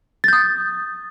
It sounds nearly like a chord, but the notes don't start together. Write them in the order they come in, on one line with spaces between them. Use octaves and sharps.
A6 G6 D#6